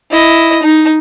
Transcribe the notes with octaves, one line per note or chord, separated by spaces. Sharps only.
E4 D#5
D#4